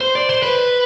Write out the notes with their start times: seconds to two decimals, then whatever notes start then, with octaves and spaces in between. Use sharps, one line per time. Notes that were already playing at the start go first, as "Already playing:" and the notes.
0.01 C5
0.15 D5
0.29 C5
0.43 B4